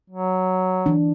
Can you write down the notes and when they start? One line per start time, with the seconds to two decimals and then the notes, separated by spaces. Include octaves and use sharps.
0.10 F#3
0.86 E3 D4